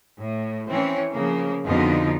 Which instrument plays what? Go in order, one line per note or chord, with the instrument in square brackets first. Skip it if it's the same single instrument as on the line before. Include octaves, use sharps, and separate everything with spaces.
[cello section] A2
E3 C4 C#4
C#3 F3 A#3
F2 B2 D3 D#4 F4